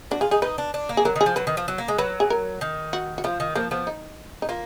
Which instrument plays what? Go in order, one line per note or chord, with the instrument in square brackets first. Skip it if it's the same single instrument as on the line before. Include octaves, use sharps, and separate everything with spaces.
[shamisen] D4 [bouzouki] F#4
[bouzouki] F4 [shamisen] G#4
[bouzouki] D#4 [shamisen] G#4
[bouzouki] D#4 [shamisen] B4
[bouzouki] D4
D4
A#3
[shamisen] G#4
[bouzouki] F#3 [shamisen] A#4
[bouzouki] D#3 [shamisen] G#4
[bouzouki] F3
[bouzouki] F#3 [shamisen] B4
[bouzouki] D#3
F3
F#3
A#3
G#3
[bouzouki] F#3 [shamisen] B4
[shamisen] G#4
A#4
[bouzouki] D#3
[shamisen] F#4
F#4
[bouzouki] F3 [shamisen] F4
[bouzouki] D#3
[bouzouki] F3 [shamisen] A#3
[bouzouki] F3 [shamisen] B3
[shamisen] D#4
D#4
[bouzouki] A#3 [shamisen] F4